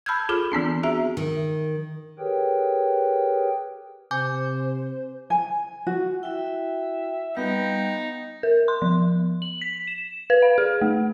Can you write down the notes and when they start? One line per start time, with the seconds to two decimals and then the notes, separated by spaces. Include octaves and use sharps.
0.06 A5 B5 E6 F6 G6 G#6
0.29 F4 G#4 A4 D6 F6
0.52 E3 B3 C4 D4
0.83 F#4 G#4 E5 A#5
1.17 D#3
2.19 G4 G#4 A#4 B4 C#5 G5
4.11 C3 C5 G#5 D6 G6
5.30 G#5
5.87 F#4
6.23 E4 F#4 E5 G5
7.37 G3 B3 D#4 F5 G5
8.43 A#4
8.68 C6
8.82 F3
9.42 F#7
9.62 B6
9.87 E7
10.30 B4
10.42 F5
10.58 G#4
10.81 A3